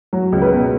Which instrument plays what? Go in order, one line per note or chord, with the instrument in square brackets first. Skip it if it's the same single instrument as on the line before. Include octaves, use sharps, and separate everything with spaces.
[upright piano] F#3
C#2
B4
B2